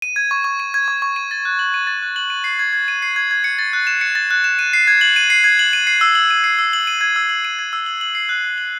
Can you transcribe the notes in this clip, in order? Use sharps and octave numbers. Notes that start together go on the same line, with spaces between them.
D#7
G#6
C#6
C#6
D#7
G#6
C#6
C#6
D#7
A6
F#6
F#7
D#7
A6
F#6
F#7
D#7
C7
G#6
G#6
D#7
C7
G#6
G#6
C#7
A6
F#6
E7
C#7
A6
F#6
E7
D#7
C7
G#6
F#7
D#7
C7
G#6
F#7
D#7
C7
E6
F#7
D#7
C7
E6
F#7
D#7
G#6
E6
F#7
D#7
G#6
E6
F#7
F#7
C7
F#6
F#6
F#7